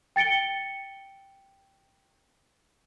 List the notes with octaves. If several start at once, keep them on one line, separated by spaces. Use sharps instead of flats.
G5 A6 C#7 D7 G7